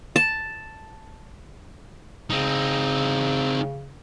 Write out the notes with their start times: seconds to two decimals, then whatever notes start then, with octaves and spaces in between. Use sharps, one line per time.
0.16 A5
2.30 C#3 C4 D#4